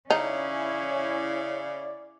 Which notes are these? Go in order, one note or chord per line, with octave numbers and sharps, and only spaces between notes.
C#3 C#4 D#4 E4 D5